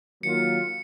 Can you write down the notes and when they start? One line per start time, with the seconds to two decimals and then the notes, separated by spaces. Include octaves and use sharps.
0.23 D#3 F#3 A#3 F4 C#7